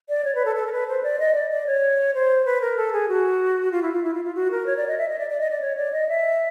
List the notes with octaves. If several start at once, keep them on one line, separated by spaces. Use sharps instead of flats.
D5
C#5
B4
A4
A4
A#4
B4
C5
D5
D#5
D5
D5
C#5
C5
B4
A#4
A4
G#4
F#4
F4
E4
F4
E4
F4
F4
F#4
A#4
C#5
D5
D#5
E5
D#5
D5
D5
D#5
D5
C#5
D5
D#5
E5